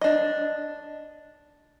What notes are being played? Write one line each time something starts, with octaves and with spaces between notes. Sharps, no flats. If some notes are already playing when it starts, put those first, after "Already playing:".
D4 D#5